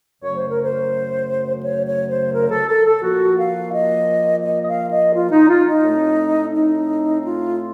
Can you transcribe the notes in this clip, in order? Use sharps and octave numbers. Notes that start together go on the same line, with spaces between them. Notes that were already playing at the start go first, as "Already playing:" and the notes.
F#2 C#3 F#3 A3 C#5
C5
A#4
C5
C#5
C#5
C5
A#4
A4
A4
A4
A#2 F3 A#3 F#4
F5
D#5
D#5
D#5
F5
D#5
F4
D#4
F4
D#4
A2 A3 C4
D#4
F4